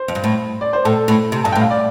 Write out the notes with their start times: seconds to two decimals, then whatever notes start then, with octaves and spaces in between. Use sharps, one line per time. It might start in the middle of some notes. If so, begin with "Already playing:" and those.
Already playing: C5
0.08 F2
0.15 G2
0.24 A2
0.61 D5
0.73 C5
0.85 A2 A4
1.08 A2
1.32 C3
1.44 G2 A5
1.52 A2 G5
1.61 F5
1.70 D5